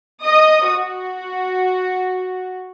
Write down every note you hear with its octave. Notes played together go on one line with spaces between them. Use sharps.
D#5 D#6
F#4